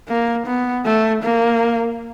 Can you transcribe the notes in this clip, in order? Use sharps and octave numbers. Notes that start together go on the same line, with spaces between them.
A#3
B3
A3
A#3